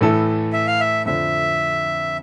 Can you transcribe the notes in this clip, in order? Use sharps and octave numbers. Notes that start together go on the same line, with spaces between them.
A2 E3 A3 E4 A4
E5
F5
E5
F2 D3 F3 E5